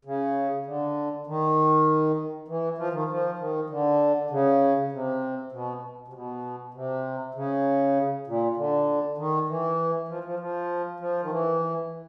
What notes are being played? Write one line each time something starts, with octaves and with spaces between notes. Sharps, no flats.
C#3
D3
D#3
E3
F3
D#3
F3
D#3
D3
C#3
C3
B2
C3
B2
C3
C#3
A#2
D3
D#3
E3
F3
F3
F3
F3
D#3
E3